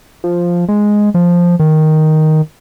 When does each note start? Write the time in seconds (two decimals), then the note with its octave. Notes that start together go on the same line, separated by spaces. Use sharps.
0.24 F3
0.69 G#3
1.14 F3
1.60 D#3